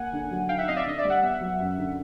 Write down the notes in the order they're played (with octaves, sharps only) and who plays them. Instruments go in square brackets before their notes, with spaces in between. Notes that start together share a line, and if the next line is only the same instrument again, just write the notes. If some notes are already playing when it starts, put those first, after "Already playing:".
Already playing: [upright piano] A#3 [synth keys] F#5 G#5
[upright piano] D3
F#3
[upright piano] D#4 [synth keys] F5 G5
[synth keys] E5 F#5
[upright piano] C4 [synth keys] D#5 F5
[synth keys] D5 E5
[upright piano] D3 [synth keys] D#5
[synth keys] D5 E5
[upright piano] G3
[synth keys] E5 F#5
[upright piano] B3 [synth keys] E5 F#5
[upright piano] F#3
F#2
D3